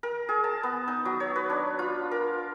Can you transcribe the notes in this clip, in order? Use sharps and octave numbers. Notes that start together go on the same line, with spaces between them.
A#4
G#4
A5
B3
D#4
F#3
C#5
B4
D4
F4
A#4